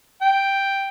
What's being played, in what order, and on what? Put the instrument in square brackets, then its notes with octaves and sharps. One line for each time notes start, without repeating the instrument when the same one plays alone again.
[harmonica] G5